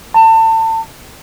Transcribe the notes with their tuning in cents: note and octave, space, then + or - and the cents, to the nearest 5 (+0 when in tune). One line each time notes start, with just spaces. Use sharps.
A5 +30